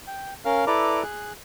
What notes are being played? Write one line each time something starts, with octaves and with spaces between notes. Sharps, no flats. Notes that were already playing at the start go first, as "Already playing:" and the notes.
G5
C#4 A#4 F5 F6
E4 A4 B4 D5 A#5 D6
G#4 F#6